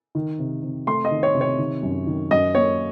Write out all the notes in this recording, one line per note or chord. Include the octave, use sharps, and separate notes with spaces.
D#3
C3
C3
A3 C6
D#5
D#3
C#5
C3
C#5
D#3
F#2
D#3
F#2 D#5
A#3 C#5